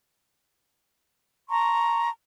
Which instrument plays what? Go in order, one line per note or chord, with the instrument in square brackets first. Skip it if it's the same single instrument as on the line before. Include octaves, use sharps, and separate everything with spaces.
[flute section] A5 A#5 C6 C#6